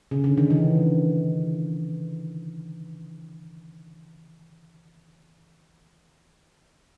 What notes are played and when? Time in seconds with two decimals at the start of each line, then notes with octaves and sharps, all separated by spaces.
0.11 C#3
0.24 D3
0.38 D#3
0.50 E3